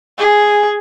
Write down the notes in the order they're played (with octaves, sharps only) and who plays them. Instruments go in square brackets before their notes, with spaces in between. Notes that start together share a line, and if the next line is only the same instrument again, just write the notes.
[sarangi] G#4